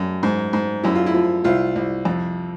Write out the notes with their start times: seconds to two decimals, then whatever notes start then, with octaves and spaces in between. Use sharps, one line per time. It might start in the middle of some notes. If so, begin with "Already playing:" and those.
Already playing: F#2
0.23 G#2
0.53 G#2
0.83 F#2 E4
0.95 F4
1.06 E4
1.14 F3
1.44 C2 F4
1.76 C2
2.05 F2